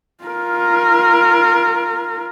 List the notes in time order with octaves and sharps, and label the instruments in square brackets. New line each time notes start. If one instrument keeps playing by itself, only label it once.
[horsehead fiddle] F4 A#4